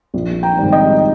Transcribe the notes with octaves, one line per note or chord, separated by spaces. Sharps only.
A#1
G5 A#5
G#2 D#3 G3 C4
D#5 G5